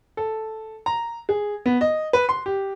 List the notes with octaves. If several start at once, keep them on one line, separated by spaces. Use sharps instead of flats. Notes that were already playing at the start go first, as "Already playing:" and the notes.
A4
A#5
G#4
B3
D#5
B4
C6
G4